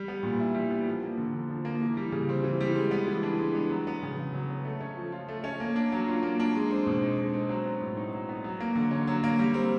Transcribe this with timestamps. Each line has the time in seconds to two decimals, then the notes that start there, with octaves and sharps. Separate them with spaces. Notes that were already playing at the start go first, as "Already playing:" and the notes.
Already playing: G3
0.08 B3
0.23 A#2
0.40 E4
0.54 G3
0.70 B3
0.87 F3
1.02 A#3
1.17 D3
1.33 D3
1.49 F3
1.65 A#3
1.81 E3
1.97 G3
2.12 C#3
2.29 C4
2.44 E3
2.61 G3
2.75 G#3
2.91 B3
3.07 E3
3.23 D4
3.39 G#3
3.55 B3
3.70 F#3
3.87 B3
4.03 C#3
4.17 C#3
4.33 F#3
4.50 B3
4.65 A3
4.80 C#4
4.97 F3
5.12 F4
5.28 A3
5.44 C#4
5.60 A#3
5.76 D4
5.92 F#3
6.08 F4
6.23 A#3
6.40 D4
6.55 G#3
6.71 C4
6.86 B2
7.02 D#4
7.18 G#3
7.33 C4
7.49 F#3
7.66 B3
7.80 A2
7.97 D#4
8.13 F#3
8.29 B3
8.44 F#3
8.60 A#3
8.75 D3
8.91 C#4
9.07 F#3
9.24 A#3
9.39 G3
9.54 C4